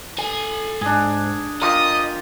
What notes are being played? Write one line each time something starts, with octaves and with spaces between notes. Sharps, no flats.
A4 G#5
G#2 D4 G#4
F4 G4 A#4 D#5 D#6